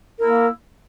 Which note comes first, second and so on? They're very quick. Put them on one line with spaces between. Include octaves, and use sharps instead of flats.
A#4 E4 A#3